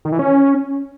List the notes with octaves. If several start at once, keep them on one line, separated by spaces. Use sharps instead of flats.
D#3
E3
C#4